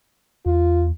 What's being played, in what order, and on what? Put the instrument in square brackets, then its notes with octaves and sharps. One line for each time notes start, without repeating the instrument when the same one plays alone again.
[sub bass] E2 [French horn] F4